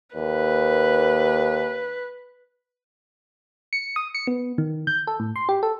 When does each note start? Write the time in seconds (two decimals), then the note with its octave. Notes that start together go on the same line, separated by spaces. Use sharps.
0.16 D#2 B4
3.73 C#7
3.96 D#6
4.15 C#7
4.27 B3
4.58 D#3
4.87 G6
5.07 A4
5.20 A2
5.36 C6
5.49 G4
5.63 A4